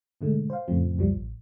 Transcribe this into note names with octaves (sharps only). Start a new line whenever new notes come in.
G#2 B2 D3 G#3 A3
C5 F5
F2 A2 C#3 F3 A3 C4
C#2 F#2 B2 F3 G3
A1